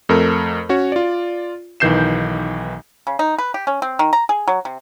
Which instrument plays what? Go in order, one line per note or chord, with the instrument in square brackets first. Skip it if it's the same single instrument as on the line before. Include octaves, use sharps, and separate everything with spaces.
[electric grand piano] F2 A3 A#4
C#4 F#4 C#5
F4 D5
B1 D#3 E3 G6 C7 E7
[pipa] C#3
D#4
B4
G4
C#4
C4
D#3
A#5
G#4
F#3
C3